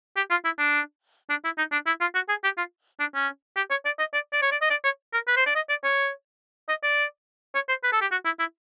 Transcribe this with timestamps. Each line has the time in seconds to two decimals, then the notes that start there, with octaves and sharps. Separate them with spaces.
0.17 G4
0.31 F4
0.45 E4
0.59 D4
1.30 D4
1.45 E4
1.58 D#4
1.72 D4
1.87 E4
2.01 F4
2.15 F#4
2.29 G#4
2.44 G4
2.58 F4
3.00 D4
3.15 C#4
3.56 G4
3.71 C#5
3.85 D5
3.99 D#5
4.14 D5
4.33 D5
4.42 C#5
4.52 D5
4.62 D#5
4.70 D5
4.84 C#5
5.14 A#4
5.28 B4
5.37 C5
5.46 D5
5.55 D#5
5.69 D5
5.84 C#5
6.69 D#5
6.83 D5
7.55 C#5
7.69 C5
7.83 B4
7.92 A4
8.02 G4
8.11 F#4
8.25 E4
8.39 E4